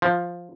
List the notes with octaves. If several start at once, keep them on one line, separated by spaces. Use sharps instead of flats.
F3